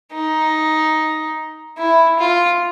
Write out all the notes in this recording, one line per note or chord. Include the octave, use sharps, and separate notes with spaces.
D#4
E4
F4